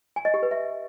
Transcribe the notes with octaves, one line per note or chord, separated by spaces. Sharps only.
G#5
D#5
G4
B4
E5